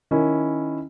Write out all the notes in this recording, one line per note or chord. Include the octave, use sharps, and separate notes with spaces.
D#3 C#4 E4